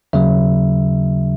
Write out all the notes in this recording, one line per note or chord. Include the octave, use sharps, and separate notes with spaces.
D#2 C#3 F#3 E5